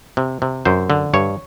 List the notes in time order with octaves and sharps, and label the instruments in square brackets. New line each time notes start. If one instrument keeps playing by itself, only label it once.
[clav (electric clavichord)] C3
C3
F#2 C5
D3
G2 C#5